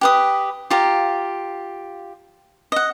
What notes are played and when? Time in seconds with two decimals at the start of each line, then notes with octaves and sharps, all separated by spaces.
0.01 G4 B4 D#6
0.70 F4 G4 F5 A#5
2.72 D#5 F#5